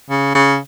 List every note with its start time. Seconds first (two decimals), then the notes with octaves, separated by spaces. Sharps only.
0.10 C#3
0.34 C#3